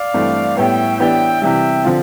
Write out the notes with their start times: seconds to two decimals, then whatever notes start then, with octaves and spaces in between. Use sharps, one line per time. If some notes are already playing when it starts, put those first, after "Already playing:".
Already playing: D5 F5
0.14 G2 E3 A3 C4
0.57 A2 G3 B3 E5 G5
0.99 E3 B3 D4 G4 E5 G5
1.41 C3 E3 G3 E5 G5
1.84 D3 F3 C4 F4